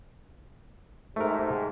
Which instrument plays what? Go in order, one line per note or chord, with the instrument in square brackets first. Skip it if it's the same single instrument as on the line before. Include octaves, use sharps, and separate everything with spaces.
[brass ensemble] G#2 C3 [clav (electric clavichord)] A3 A#4